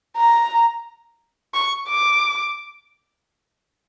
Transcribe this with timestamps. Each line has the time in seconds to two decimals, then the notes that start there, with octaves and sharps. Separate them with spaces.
0.17 A#5
1.54 C#6
1.89 D6